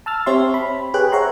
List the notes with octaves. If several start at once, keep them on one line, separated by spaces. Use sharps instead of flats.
A5 E6 F6 A6
C4 G4 C#5 E5 C6
B5
G4 G#4 B4 C#5 G5 F#6
C5 C#5 E5 F#5 A#5 C6